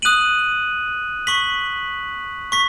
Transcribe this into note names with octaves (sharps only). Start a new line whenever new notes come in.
D#6 F#6 D#7 F#7
C#6 B6 F#7
C#6 B6